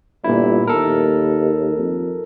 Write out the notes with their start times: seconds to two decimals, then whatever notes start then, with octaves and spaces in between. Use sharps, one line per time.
0.24 G1 A#2 E4
0.67 D#2 A4 A#4
1.78 F2